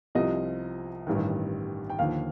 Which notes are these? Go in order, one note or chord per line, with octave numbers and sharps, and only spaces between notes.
C2 C3 F3 D#5
A1 G2 D#3
G5
D#2 D3 F3 F5